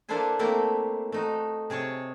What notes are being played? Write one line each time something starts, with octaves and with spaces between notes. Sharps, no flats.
A#3 D4 E4 A4 C5 G#5
A3 A#3 C4 E4
A3 D#4 F#4
C3 G#4 C#5 A5